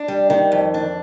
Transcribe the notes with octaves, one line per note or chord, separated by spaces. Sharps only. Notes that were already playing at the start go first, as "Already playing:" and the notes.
Already playing: D4
G3
D#3
F2
D4